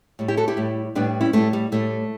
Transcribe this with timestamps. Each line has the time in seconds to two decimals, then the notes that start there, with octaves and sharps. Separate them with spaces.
0.19 A2 G3
0.28 E4 G4
0.37 F#4 A4
0.48 E4 G4
0.57 A2 G3
0.95 A2 G3 B3 D4
1.21 C#4 E4
1.33 A2 G3 A3 C#4
1.53 G3
1.72 A2 G3 A3